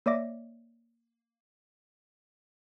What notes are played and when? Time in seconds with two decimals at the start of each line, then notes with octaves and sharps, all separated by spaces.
0.06 A#3 C#5 D5 E5 D6 A#6